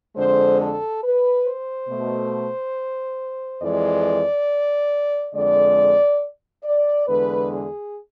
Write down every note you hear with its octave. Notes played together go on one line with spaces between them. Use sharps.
F2 D3 G#3 C5
A4
B4
C5
B2 A3
F2 E3 G#3 D5
F2 D3 G#3 D5
D5
E2 D3 G#3 B4
G#4